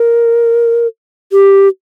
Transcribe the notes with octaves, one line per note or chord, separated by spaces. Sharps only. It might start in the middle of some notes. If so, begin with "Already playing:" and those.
Already playing: A#4
G4